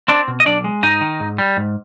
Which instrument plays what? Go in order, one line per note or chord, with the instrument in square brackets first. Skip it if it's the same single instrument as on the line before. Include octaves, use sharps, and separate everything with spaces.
[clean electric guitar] C4 D4 D5
B2
D#5
B1 D4 D5
G#3
G#2 D#4 D#5
D#3
G#2
G3
G#2